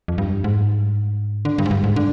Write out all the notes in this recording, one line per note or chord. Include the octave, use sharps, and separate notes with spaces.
F2
G2
G#2
D3
G2
G#2
G2
G#2
D3